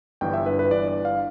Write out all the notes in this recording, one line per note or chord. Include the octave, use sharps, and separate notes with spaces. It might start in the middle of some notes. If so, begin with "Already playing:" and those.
G1 G2 E3 G5
E5
B4
B4
G1 G2 E3 D5
D5
F5